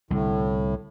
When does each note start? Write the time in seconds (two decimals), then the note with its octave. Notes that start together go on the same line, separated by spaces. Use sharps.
0.11 C2 A2 D3